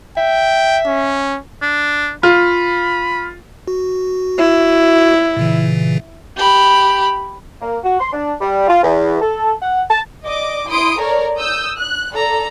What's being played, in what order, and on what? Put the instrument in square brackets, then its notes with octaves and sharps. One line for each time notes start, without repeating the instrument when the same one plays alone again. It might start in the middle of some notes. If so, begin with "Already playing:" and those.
[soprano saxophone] E5 [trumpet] G5
[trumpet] C#4
[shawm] D4
[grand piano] F4 [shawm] B5
[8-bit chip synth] F#4
[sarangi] E4
[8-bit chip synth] A#2 C#3 E3
[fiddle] G4 B5
[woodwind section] A#3
F#4
C6
D4
G3
F4
E2
A4
F#5
A5
[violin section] D5 D#5 D6
E4 C6 D#6 D7
A4 A#4 C#5 D5
D#6 E6 G6
F#6
A4 D5 A#5